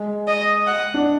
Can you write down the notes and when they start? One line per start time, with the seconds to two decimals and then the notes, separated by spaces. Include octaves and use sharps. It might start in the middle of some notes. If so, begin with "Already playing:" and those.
Already playing: G#3
0.27 D#5
0.66 F#5
0.94 D4